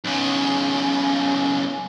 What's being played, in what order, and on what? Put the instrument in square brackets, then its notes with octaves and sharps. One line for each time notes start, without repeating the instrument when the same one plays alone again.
[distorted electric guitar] B1 C#3